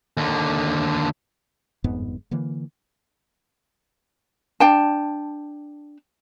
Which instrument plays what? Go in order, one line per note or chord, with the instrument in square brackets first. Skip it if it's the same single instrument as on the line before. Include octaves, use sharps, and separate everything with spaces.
[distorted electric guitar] D#2 D3
[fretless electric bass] G1 F2 G#2 B3
D3 E3 A#3
[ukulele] D4 G5 A5